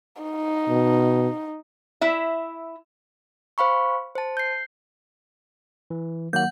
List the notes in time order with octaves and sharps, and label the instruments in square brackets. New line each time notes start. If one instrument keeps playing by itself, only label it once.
[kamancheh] D#4
[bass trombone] B2
[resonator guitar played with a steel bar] E4 E5
[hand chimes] C5 F5 B5 C#6
C5 A5
G6 C7
[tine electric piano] E3
[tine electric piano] D#3 F#3 A#3 [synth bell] F#5 G6